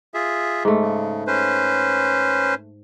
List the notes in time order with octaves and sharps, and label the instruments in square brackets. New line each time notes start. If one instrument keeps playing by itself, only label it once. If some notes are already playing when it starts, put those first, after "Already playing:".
[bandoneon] F4 G#4 E5
[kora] G#2 A3
[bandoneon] C#3
C#4 B4 C5